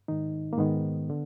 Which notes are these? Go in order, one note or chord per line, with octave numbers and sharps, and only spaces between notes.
G#2 D#3 D#4
A#3
G#2 D#3 B3
D3